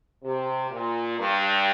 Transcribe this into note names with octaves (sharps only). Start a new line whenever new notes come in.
C3
A#2
G2